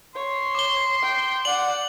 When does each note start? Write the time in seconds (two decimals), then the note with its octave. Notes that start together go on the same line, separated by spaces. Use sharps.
0.15 C#5 C6
0.55 D6 G7
1.03 G5
1.45 D5 F#5 F#7